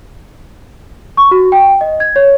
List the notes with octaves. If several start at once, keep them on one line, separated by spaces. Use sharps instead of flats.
C#6
F#4
G5
D#5
G#6
C#5